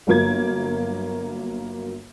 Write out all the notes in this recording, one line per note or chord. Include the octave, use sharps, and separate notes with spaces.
G1 F#3 A#3 G#6